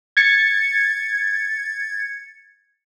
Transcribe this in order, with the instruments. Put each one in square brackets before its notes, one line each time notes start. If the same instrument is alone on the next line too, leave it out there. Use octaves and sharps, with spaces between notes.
[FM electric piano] G#6 A6 C#7